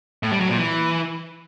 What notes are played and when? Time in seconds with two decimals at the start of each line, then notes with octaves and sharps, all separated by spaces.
0.23 A2
0.32 G3
0.40 F#3
0.49 A#2
0.58 E3